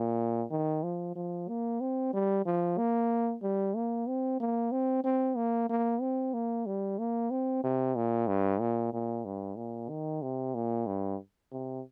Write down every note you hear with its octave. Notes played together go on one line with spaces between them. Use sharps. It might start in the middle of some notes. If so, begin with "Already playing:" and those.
Already playing: A#2
D#3
F3
F3
A#3
C4
G3
F3
A#3
G3
A#3
C4
A#3
C4
C4
A#3
A#3
C4
A#3
G3
A#3
C4
C3
A#2
G2
A#2
A#2
G2
A#2
D#3
C3
A#2
G2
C3